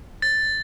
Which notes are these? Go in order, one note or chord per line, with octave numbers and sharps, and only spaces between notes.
A6